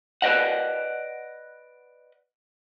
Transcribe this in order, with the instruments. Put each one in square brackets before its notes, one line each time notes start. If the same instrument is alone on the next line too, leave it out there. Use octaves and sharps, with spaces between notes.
[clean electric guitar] B4 D5 D#5 F#5